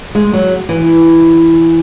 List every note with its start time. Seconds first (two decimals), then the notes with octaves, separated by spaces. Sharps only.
0.15 G#3
0.33 F#3
0.69 E3